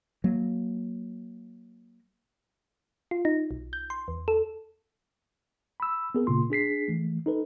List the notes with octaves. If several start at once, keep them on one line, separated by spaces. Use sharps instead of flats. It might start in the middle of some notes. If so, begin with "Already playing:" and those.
F#3 A#3
F4
D#4
B1
G6
C6
E2
A4
B5 E6
B3 G#4 A#4
A#2 C#3 A#3 F4 C6
D4 G#4 B6 C7
E3 A3
D#4 A4 B4